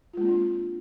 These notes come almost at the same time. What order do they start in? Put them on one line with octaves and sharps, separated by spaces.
F4 G#3 A#3 C4 D4